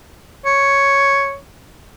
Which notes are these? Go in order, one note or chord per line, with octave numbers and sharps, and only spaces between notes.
C#5